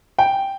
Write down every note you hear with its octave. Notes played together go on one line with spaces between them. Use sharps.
G5